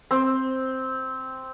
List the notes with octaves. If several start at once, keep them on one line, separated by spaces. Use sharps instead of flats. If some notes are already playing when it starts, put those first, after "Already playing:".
C4